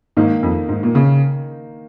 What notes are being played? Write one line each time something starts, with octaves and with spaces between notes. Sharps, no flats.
G#2 D#3 A#3 D#4
F2
G#2
A#2
C#3